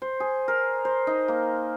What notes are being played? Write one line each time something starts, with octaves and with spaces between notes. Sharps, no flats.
C5
G#4
A#4
C5
D#4
A#3